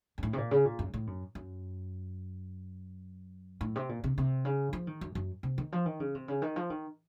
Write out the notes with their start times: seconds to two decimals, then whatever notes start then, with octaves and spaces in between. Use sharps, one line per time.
0.18 F#2
0.23 A2
0.33 C3
0.38 A#2
0.51 C#3
0.65 A#2
0.79 F#2
0.94 A2
1.07 F#2
1.35 F#2
3.61 A2
3.76 C3
3.89 A#2
4.04 C3
4.18 C3
4.45 C#3
4.73 F3
4.87 D#3
5.01 F#2
5.15 F#2
5.43 C3
5.58 D#3
5.72 F3
5.86 D#3
6.00 C#3
6.15 C3
6.28 C#3
6.42 D#3
6.56 F3
6.70 D#3